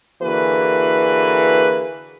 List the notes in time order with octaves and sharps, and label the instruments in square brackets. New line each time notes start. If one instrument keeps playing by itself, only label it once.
[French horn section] D3 E3 A#3 F#4 G#4 B4